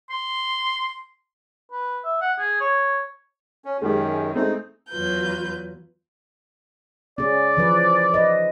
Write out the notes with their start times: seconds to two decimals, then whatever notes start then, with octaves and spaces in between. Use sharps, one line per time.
0.10 C6
1.72 B4
2.04 E5
2.21 F#5
2.39 G#4
2.60 C#5
3.65 C#4
3.82 F#2 D#3 G#3 G4
4.35 G#3 A3 C4 D#4
4.90 E2 F#3 F4 B4 G6
7.18 C#4 G#4 D5
7.57 E3 F3 B4
8.14 B4 D#5